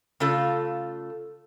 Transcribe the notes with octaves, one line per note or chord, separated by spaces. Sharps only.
C#3 A3 F4 A4